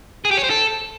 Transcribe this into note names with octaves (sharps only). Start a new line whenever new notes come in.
G#4
G4
C#5
C5
A4